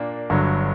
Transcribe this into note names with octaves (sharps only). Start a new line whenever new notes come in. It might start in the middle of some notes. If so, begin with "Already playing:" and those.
Already playing: A#2 A#3 D4
G1 G2 D3 F#3